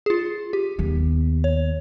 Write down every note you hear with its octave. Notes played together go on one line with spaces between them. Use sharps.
F4 G#4
G4
D#2 B3
C#5